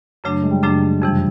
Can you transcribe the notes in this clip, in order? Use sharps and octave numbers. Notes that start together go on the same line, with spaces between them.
F#2 C#3 F#3 A3 D4
G#3
G3
F#2 C#3 F#3 G3 A3 D4
F2 C3 E3 G3